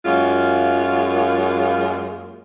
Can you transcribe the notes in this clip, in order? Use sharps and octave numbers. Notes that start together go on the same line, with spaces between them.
F#2 G#3 A#3 F4